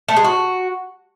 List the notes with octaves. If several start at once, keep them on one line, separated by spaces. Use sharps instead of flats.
A3
G#3
F#4